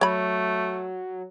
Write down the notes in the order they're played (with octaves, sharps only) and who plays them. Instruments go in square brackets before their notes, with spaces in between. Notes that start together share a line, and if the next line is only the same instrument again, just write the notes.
[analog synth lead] F#3 [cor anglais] A3 [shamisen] C#5 B5